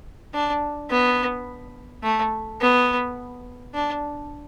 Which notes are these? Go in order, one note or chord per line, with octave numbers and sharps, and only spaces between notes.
D4
B3
A3
B3
D4